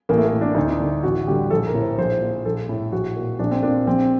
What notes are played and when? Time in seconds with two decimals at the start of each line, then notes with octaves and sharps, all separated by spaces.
0.09 A1 A#3
0.18 A3
0.25 A#3
0.33 A2
0.41 D4
0.55 D2 D#4
0.68 D4
0.80 D3
1.03 A1 F#4
1.27 G2 D3 G4
1.51 A#1 A4
1.67 A#4
1.74 A2
1.82 C5
1.98 A#1 C5
2.21 A#2
2.45 A#1 A4
2.69 A2
2.92 A#1 F#4
3.16 A#2
3.39 A#1 D4
3.51 C4
3.63 A#2 D4
3.87 A#1 C4